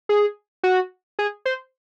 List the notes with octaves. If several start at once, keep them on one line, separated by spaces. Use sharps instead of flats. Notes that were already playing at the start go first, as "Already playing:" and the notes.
G#4
F#4
G#4
C5